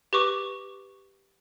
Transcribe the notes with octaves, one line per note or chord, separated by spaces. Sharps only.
G4 B4 C#6 D6